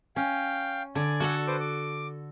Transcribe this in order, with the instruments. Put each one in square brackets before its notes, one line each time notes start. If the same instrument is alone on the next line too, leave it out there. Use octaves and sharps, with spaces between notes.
[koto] C#4 [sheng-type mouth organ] F5 G5
[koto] D3 [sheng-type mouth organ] D5 G#5
[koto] F#4 A4 F#5
[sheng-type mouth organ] B4 C5 D6
D6